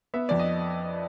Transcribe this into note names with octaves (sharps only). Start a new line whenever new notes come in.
B3 E5
F2 D5
D#5